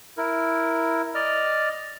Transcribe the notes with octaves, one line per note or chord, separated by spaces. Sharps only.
E4 A#4
D5 D#5 F6